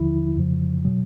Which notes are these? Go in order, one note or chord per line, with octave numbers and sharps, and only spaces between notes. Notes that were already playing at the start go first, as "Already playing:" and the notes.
Already playing: D#2 D3 F3 E4
F2 C#3 F3
B2 F#3